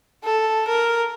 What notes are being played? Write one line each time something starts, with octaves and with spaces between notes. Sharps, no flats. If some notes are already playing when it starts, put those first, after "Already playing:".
A4
A#4